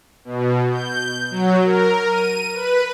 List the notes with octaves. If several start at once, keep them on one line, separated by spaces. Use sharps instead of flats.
B2
G6
F#3
A#4
D#7
B4